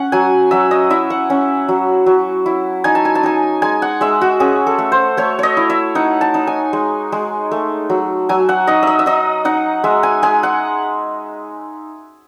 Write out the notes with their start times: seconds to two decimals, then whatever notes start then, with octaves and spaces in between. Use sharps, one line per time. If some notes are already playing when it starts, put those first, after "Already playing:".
Already playing: C#4 F#5
0.12 F#3 G#5
0.51 F#3 E5
0.71 D#5
0.90 E4 E5
1.10 F#5
1.30 C#4
1.69 F#3
2.06 F#3
2.46 E4
2.84 D#4 G#5
2.95 A5
3.05 G#5
3.15 A5
3.23 D#4 G#5
3.62 G#3 G#5
3.82 F#5
4.01 G#3 E5
4.21 F#4
4.40 C#4 G#4
4.67 A4
4.78 A3
4.92 C5
5.17 A3 C#5
5.39 C#5 D#5
5.57 E4
5.70 E5
5.95 D#4 F#5
6.21 A5
6.34 D#4
6.47 G#5
6.73 G#3
7.12 G#3
7.51 A3
7.90 F#3
8.29 F#3 G#5
8.49 F#5
8.67 D#4 D#5
8.83 D#5 E5
8.99 E5
9.06 D#4 D#5
9.45 D#4 F#5
9.84 G#3 E5
10.03 G#5
10.23 G#3 G#5
10.43 F#5